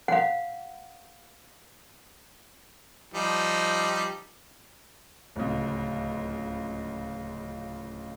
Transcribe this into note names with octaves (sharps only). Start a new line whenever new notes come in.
F5 F#5
F3 G3 D#4
D1 C#2